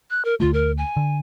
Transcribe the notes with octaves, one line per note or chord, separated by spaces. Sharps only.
F#6
A#4
D2 D3 A3 F4
A#4
G#5
D3